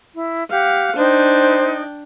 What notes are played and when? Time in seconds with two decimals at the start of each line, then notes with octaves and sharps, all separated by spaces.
0.14 E4
0.50 G4 F5 F#5
0.97 D4 D#4 C5 G5